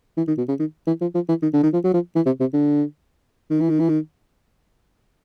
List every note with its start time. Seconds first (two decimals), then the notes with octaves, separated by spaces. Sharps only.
0.17 E3
0.28 D#3
0.38 B2
0.48 C#3
0.59 D#3
0.87 E3
1.01 F3
1.15 F3
1.29 E3
1.42 D#3
1.53 D3
1.63 D#3
1.73 F3
1.84 F#3
1.94 F3
2.15 E3
2.26 C3
2.40 C3
2.53 D3
3.50 D#3
3.60 E3
3.69 D#3
3.80 E3
3.89 D#3